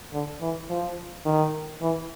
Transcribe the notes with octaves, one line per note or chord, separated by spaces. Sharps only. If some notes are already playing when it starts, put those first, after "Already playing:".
D3
E3
F3
D#3
E3